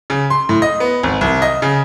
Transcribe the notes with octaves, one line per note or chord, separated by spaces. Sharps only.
C#3
C6
A2
D#5
B3
G#1
C2
D#5
C#3